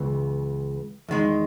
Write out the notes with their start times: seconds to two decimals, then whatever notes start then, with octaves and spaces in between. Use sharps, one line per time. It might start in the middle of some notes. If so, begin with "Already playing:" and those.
Already playing: C#2 C#3 E3 B3
1.09 E2 D#3 G#3